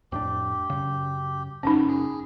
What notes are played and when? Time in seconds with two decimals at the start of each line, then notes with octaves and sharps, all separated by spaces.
0.12 F2 A2 D4 G4
0.70 F#2 C#3
1.63 F#1 F#2 C#4 D#4 F#4
1.88 G#4